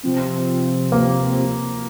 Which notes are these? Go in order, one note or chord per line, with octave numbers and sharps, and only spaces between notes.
C3 F3 C4
A#3